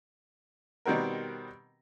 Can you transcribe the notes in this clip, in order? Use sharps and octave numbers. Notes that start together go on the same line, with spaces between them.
B2 D#3 G3 C4 F#4 A#4